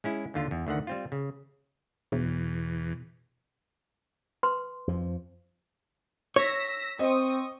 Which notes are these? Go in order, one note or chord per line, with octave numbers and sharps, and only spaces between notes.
G#3 C#4 E4
D#2 D3 F4
E2
D2 D3 D#3 F#5
G3 C4 F4
C#3
E2 B2
B4 C6
F2 F3
C#5 E6 A#6 B6
C4 D#5 C#6 D#6